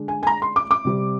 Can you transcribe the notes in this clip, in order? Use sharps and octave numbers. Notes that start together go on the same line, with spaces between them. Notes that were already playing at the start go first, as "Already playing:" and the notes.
Already playing: D3 G#3 D4
G#5
G#5
A#5
C6
D6
D6
C3 G3 C4